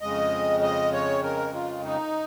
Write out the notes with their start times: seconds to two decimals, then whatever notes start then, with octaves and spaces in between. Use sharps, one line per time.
0.01 F2 C#3 G#3 D#5
0.62 D#5
0.93 C#5
1.23 A#4
1.54 F4
1.85 D#4